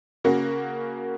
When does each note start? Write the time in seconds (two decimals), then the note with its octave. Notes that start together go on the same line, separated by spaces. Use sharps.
0.24 C#3 A#3 F#4